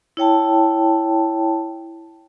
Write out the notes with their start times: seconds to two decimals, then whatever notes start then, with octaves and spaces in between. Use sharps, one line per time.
0.17 E4 C#5 G5 A5